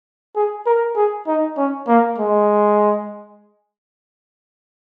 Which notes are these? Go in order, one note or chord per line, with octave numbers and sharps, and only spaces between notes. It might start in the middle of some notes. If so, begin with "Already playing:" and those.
G#4
A#4
G#4
D#4
C#4
A#3
G#3